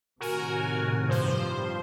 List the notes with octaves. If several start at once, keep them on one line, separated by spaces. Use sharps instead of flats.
A2 C3 D#3 F#4 A#4 G#5
G2 F3 C5